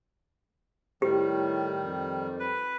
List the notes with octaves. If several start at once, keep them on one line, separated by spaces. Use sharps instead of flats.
A2 D#3 G3 G4
F2
B4